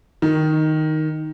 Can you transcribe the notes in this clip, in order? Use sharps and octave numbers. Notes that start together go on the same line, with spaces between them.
D#3